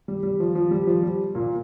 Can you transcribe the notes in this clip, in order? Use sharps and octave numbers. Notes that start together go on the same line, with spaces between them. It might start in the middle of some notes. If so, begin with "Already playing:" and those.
G3
G3
F3
F3
G3
F3
G3
A#2 A#3